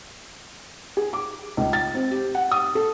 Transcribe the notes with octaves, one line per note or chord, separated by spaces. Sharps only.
G#4
D6
C#2
A6
C4
G4
F#5
D#6
A4